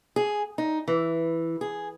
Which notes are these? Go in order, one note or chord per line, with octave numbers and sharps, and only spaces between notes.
G#4
D#4
E3
G#4